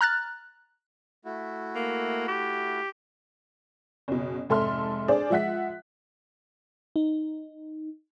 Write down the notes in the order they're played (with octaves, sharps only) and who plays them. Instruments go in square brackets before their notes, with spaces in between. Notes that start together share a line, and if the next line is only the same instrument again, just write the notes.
[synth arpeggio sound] A#5 F6 F#6 A6
[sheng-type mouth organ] A3 E4 F#4
[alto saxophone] A#3
G4
[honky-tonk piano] F#1 B2
F1 G#2 A4 E5 C6 F6
D4 G#4 C5 D5
F3 G#3 E5 F#5 F#6 B6
[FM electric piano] D#4